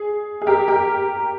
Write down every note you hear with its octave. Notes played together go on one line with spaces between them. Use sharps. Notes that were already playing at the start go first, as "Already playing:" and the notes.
Already playing: G#4
G#4
G4 A#4
G4 A#4